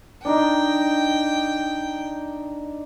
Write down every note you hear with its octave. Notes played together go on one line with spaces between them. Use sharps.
D4 D#4 D#5 G5